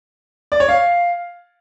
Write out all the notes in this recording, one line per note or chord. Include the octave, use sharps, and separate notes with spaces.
D5
C#5
F5